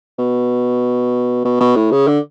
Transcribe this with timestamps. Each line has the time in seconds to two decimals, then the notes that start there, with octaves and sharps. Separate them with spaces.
0.19 B2
1.45 B2
1.60 B2
1.76 A2
1.92 C#3
2.08 D3